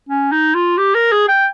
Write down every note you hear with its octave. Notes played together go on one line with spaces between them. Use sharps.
C#4
D#4
F4
G4
A#4
G#4
G5